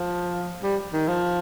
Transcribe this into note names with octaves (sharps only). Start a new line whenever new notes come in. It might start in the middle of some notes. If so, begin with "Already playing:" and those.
Already playing: F3
G3
D#3
F3